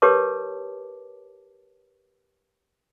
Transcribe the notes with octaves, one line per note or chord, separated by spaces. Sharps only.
G4 A#4 B4 C#5 A5 D6